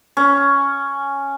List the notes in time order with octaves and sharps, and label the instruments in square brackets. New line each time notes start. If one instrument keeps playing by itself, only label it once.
[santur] C#4